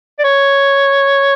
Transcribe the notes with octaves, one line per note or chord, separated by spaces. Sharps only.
D5
C#5